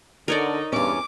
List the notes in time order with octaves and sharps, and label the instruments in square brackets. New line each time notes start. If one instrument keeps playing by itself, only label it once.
[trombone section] D3 [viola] D#4 [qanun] A#4 C#5 D5
[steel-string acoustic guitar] E2 C#4 [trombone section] G2 [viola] D6